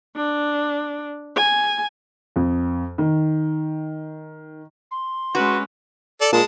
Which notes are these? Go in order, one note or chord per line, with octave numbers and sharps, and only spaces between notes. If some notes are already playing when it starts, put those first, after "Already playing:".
D4
G#5
F2
D#3
C6
G#3 C#4 F#4 B4
A4 D5
A#2 G#3 A5